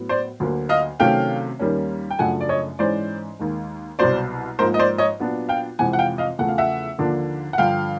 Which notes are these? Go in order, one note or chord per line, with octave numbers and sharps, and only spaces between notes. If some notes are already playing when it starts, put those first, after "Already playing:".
Already playing: A2 F#3 B3
C5 D5
D2 D3 F#3 A#3
D#5 F5
C3 D#3 F#3 A3 C#4 F5 G5
D#2 D#3 G3 A#3 C#4
G5
F#2 C#3 F3 A3 D4 F#5 G#5
D5
C#5 D#5
G#2 E3 G#3 C#4 C5 D5
D#2 D#3 G#3
C2 B2 F#3 B3 C5 D5
G#2 F3 A#3 A#4 C5
D#5
C5 D5
C#5 D#5
A#2 F#3 B3 D4
F5 G5
F2 C3 E3 G#3 F#5 G#5
F#5
F5 G5
D#5 F5
E2 C#3 F3 A3 F#5
F5
E5 F#5
D#2 D3 F3 A#3 D4
F#5
G2 D3 F3 F5 G5